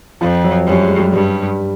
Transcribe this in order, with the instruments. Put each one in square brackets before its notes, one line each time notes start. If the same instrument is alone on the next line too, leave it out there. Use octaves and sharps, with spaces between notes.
[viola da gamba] F2 [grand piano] F3
[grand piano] F#3
[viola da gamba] F#2 [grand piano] G3
[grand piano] G#3
G3
[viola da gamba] G2 [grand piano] G3